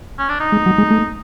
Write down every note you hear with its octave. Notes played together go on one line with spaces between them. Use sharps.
C#4
D4
D#4
G#3
F#3
G#3
A3